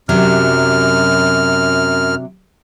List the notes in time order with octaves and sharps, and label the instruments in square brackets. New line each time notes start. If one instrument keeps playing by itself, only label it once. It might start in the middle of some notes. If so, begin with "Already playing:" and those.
[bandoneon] F#2 F6 [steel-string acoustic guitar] C3 F#3 D4